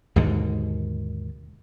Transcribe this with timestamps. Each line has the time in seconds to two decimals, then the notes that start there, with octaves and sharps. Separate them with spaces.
0.16 D#2 G#2 B2 D3